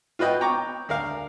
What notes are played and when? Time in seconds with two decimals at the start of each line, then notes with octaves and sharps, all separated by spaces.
0.19 F4 F#4 B4 D#5 G5
0.41 G5 A#5 C#6 D6
0.89 D2 A#4 F5